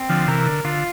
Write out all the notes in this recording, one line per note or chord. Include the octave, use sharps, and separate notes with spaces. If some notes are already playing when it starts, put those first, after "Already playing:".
Already playing: C4
D3 F3
C3 E3 A#4
D3
D3 F4